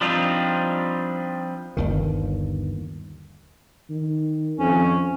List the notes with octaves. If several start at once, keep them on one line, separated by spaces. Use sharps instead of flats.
F3 G3 C4 D4 D#4 F4
G1 D#2 D#3
D#3
F2 C#4